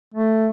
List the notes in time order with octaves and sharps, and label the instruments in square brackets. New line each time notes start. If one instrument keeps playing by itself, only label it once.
[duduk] A3